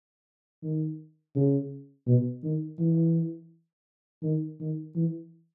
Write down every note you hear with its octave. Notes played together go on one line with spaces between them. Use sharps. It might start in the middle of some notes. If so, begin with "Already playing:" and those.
D#3
C#3
B2
D#3
E3
D#3
D#3
E3